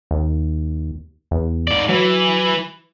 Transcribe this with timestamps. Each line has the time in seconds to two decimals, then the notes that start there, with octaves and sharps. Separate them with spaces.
0.11 D#2
1.31 E2
1.67 G#2 D5
1.89 E3 F#3